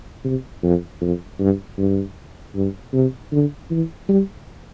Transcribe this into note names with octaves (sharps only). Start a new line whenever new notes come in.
C3
F2
F2
G2
G2
G2
C3
D3
E3
G3